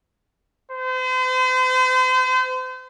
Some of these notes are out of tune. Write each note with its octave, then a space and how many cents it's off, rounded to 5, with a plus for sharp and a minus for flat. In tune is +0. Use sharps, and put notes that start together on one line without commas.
C5 -40